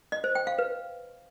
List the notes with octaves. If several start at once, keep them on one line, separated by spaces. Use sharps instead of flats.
D#5
C5
G5
F5
B4